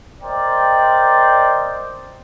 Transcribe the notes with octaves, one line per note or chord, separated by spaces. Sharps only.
A#4 C5 D5 D#5 G5